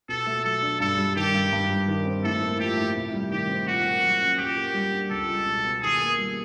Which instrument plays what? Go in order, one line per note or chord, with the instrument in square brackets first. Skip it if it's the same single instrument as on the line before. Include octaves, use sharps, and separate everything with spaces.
[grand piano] B2 [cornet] A4
[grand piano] A3
[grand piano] F#3 [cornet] A4
[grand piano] D4
[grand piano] G2 [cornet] A4
[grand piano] G3
[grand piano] D#3 [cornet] G4
[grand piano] G2
G2
G3
D#3
C4
[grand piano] A2 [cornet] A4
[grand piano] A#3
[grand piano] F3 [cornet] G4
[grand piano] A2
C3
G3
[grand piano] D#3 [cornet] G4
[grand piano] C4
[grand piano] A#2 [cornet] F#4
[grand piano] A#3
F#3
C#4
[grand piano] A#2 [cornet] G4
[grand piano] A#3
G3
D4
[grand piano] C#2 [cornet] A4
[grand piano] G#3
B2
B3
[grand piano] D#3 [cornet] G#4
[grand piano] A#3
G3